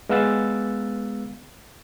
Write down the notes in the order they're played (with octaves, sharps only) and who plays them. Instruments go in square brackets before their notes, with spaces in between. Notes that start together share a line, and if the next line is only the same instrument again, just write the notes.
[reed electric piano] G#3 B3 F5 E6 F#6 A6